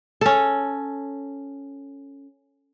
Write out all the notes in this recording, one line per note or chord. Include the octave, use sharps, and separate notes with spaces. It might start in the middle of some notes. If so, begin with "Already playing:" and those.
C#4 A4